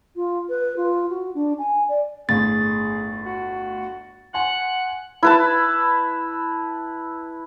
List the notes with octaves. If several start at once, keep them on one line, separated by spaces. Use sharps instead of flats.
F4
B4
F4
F#4
D4
G#5
D5
G1 A2 G#4 A6
F#4
F#5 G#5 C6
E4 B4 A5